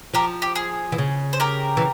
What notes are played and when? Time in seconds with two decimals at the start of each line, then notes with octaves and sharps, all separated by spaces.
0.14 F3 G4 A#4
0.42 G4
0.56 G#4
0.92 E3
0.98 C#3
1.33 C5
1.40 G4 A#4
1.77 E3